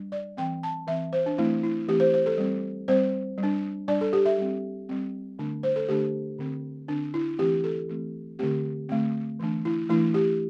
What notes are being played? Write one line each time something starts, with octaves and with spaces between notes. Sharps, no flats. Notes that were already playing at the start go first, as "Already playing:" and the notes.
Already playing: G3 D4
D5
E3 C4 G5
A5
E3 C4 E5
C5
D4
E3 A3 C4 E4
E4
E3 A3 C4 G4
C5
C5
A4
G3 C4
G3 C4 C5
G3
D4
G3 D4 D5
A4
G4
E5
G3 C4
G3 C4
D3 A3 D4
C5
A4
D3 A3 D4 G4
D3 C4
D3 C4 D4
E4
E3 A3 C4 G4
A4
E3 A3 C4
D3 A3 C4 G4
D3 A3 C4
E3 A3 D4
E4
E3 A3 D4 E4
G4